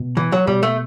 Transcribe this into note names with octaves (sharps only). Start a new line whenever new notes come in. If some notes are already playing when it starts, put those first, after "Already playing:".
Already playing: B2
E3
F#3
B2 G3
A3